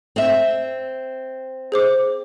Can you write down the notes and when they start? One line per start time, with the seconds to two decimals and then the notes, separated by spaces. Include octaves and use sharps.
0.16 C4 E5
1.72 G#4 C5 D6